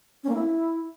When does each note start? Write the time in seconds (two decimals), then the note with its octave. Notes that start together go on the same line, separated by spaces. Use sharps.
0.24 C#4
0.29 A#3
0.34 E4